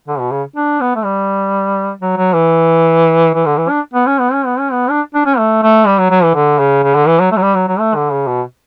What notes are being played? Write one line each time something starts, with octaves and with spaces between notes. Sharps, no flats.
D3
B2
C#3
D4
B3
A3
G3
F#3
F#3
E3
E3
D3
E3
D4
B3
C#4
B3
C#4
B3
C#4
B3
D4
D4
C#4
A3
A3
G3
F#3
F#3
E3
D3
C#3
C#3
D3
E3
F#3
A3
F#3
G3
F#3
F#3
A3
D3
C#3
B2